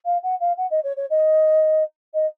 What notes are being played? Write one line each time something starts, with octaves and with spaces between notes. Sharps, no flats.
F5
F#5
F5
F#5
D#5
C#5
C#5
D#5
D#5